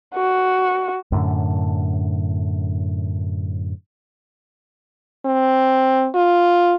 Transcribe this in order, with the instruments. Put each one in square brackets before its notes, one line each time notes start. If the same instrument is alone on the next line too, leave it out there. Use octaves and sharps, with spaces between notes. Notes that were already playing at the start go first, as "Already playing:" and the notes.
[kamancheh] F#4
[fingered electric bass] F#2 A2 D3
[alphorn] C4
F4